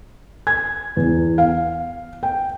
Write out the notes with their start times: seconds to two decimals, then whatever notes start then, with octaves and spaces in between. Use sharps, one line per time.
0.47 G#6
0.97 E2
1.38 F5
2.23 G5